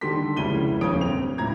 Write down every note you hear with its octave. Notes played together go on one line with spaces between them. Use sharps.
D3 D#3 G3 A4 C6 B6
F1 C#2 C#3 E4 D#7 G7
D#1 F2 A#3 C#5 D#6 D7
D1 C4 F7
C#2 A2 E4 F4 A#5 G#6